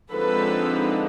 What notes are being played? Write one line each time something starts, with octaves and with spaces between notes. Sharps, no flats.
D3 F3 G#3 C4 D#4 A4 B4